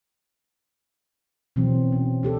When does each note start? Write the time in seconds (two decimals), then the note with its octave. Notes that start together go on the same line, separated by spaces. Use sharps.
1.56 B2 E3 F#3 C4
1.92 C#4
2.23 D4 G4 A4